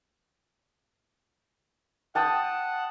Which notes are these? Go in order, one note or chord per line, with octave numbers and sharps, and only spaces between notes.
F#5 G5 A5 D#6